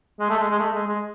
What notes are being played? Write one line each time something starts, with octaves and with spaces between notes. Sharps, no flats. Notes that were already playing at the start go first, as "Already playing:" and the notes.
G#3
A3
G#3
G#3
A3
G#3
G#3